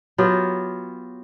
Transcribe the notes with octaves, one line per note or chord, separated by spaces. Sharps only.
F#3 B3 F4 G4